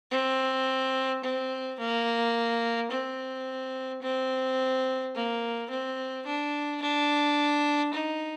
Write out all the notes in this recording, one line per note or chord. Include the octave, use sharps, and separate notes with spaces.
C4
C4
A#3
C4
C4
A#3
C4
D4
D4
D#4